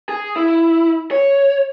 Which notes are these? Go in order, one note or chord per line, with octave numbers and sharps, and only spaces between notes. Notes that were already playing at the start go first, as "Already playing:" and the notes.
G#4
E4
C#5